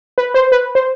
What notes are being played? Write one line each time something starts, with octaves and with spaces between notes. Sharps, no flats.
B4
C5
B4
C5